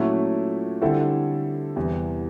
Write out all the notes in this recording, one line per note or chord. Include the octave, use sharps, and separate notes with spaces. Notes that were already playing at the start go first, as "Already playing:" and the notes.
Already playing: A#2 F#3 A3 C#4 E4
D3 G3 C4 E4 A4
E2 C3 E3 G3